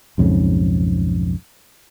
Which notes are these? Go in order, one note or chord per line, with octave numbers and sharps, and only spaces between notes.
B1 F2 G#2 C#3